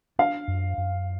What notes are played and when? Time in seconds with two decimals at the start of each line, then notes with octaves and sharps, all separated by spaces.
0.19 D4 F5
0.48 F#2
0.78 F#2